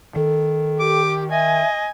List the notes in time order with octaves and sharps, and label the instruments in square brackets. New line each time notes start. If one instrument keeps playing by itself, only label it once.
[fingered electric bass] D#3 [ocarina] A4
[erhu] G4 [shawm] D6
[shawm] D#5 [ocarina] E5 [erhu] G#5